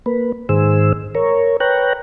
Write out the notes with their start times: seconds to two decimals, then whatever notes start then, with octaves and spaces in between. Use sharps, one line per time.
0.06 A#3 B4
0.49 G#2 D#3 G#4 C5 E6
1.15 A#4 C#5
1.60 B4 C#5 G5 A#5 F#6